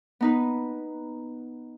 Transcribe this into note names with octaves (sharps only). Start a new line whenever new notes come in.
B3 D#4 B4